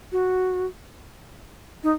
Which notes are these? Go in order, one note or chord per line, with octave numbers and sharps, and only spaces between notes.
F#4
D#4